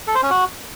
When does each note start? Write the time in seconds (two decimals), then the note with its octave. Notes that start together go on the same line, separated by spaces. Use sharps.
0.07 A4
0.15 C5
0.23 C#4
0.30 F#4